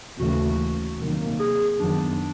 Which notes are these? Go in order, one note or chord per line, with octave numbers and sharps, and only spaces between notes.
D#2 C#3 E3 A3 F#4
C3 D#3 F#3 A#3
G#4
F#2 D#3 F#3 B3 D4